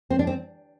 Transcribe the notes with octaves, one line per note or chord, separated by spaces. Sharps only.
C4
D4
C4